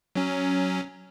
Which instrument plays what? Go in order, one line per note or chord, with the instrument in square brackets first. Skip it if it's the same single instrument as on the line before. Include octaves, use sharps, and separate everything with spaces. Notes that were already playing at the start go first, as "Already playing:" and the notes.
[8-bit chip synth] F#3 C#4